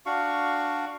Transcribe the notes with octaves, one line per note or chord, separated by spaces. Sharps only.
D4 F#4 F5 C#6